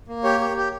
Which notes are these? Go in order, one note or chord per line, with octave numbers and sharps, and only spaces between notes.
A#3
G4 C#5
G4
G4